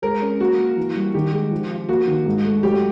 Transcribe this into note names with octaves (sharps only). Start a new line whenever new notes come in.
G#3 A#4
C#4
A#3 F#4
A#3
E3
G3
D#3 G4
G#3
F3
F4
A#3 F#4
D#3
G#2
A3
F#3 G4